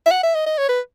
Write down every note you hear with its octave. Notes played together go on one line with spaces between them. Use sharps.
E5
F#5
E5
D#5
D#5
C#5
B4